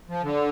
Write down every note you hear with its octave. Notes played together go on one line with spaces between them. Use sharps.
F3
D3